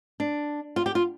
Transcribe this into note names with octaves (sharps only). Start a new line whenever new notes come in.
D4
F4
G4
F4